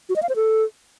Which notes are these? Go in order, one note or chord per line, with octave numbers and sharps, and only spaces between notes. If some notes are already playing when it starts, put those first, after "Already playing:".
F#4
D#5
F5
C5
A4